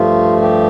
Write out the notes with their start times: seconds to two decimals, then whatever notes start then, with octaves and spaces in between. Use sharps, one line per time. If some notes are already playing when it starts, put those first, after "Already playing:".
Already playing: G2 F3 A3 F4
0.42 G4